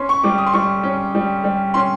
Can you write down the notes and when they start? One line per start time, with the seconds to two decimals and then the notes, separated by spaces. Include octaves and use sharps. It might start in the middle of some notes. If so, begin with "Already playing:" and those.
Already playing: C#4 C6
0.09 C#6
0.23 G3 D6
0.38 D#6
0.46 C6
0.54 G3 C#6
0.83 C#4
1.15 G3
1.44 G3
1.74 C#4 C6